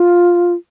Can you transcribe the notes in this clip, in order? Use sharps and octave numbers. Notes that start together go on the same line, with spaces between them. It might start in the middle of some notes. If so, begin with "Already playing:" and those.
Already playing: F4